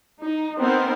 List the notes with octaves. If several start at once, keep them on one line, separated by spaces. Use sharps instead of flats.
D#4
B3 C4 D#4 A#4 C5